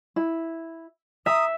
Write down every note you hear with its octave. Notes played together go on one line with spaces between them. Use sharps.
E4
E5 A#5 D#6